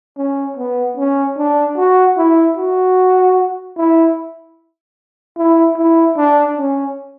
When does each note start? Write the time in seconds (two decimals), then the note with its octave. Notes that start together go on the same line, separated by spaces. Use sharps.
0.18 C#4
0.57 B3
0.97 C#4
1.38 D4
1.77 F#4
2.18 E4
2.57 F#4
3.77 E4
5.37 E4
5.77 E4
6.17 D4
6.57 C#4